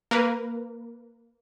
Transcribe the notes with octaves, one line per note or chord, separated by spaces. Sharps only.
A#3 A#4 B4